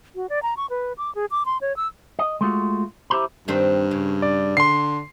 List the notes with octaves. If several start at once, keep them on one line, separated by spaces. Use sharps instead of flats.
F#4
D5
A#5
C#6
B4
D6
G#4
D6
C6
C#5
E6
D#5
G#3 A3 F4 F#4
E4 G4 C5 A#5 B5
G2 D#3 C4 D4
C#3
D5
D3 C6 C7